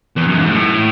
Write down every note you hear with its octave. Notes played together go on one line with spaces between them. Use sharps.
E2
F#2
G#2
A2